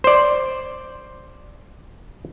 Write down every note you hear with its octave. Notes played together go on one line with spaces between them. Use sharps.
C5 D5